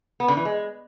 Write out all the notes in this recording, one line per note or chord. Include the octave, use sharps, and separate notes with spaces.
B3
D3
E3
G#3